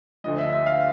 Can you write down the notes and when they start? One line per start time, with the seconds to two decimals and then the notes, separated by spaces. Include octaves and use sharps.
0.24 D2 D3 F3 D#5
0.38 E5
0.53 E5
0.66 F5